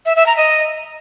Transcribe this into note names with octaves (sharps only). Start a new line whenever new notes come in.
E5
E5
A#5
D#5